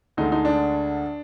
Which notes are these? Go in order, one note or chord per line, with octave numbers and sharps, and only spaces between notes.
D2 D3 G#3 D#4
D#4
D4